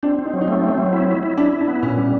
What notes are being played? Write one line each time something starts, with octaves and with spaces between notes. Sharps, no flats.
C4 D4
C4
D#4
F#3
D#4
A3
C4
F#3
E4
E4
E4
D4 E4
E4
D4
B3
A#2 C#4
G3